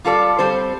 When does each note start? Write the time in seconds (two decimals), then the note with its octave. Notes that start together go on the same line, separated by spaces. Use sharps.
0.05 G3 F4 A4 D5
0.39 G3 C4 A4 C5